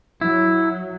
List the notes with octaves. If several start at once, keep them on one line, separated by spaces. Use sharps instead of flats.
F#3 E4